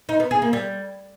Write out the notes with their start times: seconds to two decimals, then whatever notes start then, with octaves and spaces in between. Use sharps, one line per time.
0.09 D#4
0.20 B3
0.31 G#4
0.42 A#3
0.53 G3